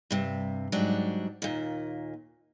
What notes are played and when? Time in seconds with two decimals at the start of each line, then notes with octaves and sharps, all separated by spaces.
0.11 G2 C3
0.72 G#2 F#3 G3 D4
1.42 D#2 A#2